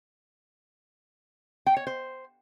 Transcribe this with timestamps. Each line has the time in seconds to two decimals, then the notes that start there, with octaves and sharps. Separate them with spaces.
1.66 G5
1.77 C#5
1.87 C5